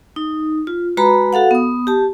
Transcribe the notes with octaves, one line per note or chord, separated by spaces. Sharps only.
D#4
F4
G#3 F#4 B4 A#5 B5
F#4 A4 F5 F#5
B3 D#6
G4 A5